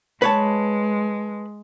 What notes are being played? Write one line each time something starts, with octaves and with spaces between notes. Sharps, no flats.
G#3 B4 C#5 A5